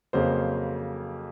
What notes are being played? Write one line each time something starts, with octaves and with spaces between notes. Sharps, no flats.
F2 C#3 F#3 A#3 C5